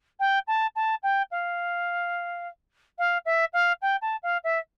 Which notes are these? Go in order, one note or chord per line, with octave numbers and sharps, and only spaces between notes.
G5
A5
A5
G5
F5
F5
E5
F5
G5
A5
F5
E5